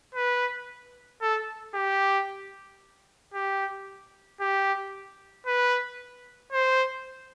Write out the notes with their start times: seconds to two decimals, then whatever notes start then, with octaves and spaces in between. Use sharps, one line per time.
0.15 B4
1.21 A4
1.74 G4
3.34 G4
4.41 G4
5.47 B4
6.52 C5